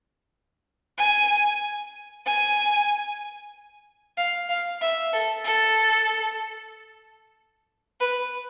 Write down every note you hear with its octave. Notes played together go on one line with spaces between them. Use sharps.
G#5
G#5
F5
F5
E5
A4
A4
B4